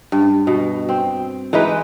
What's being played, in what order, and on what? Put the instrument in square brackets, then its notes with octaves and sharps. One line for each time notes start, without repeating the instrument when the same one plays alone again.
[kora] G2
B2
C4
E3 G#3 D#4 B4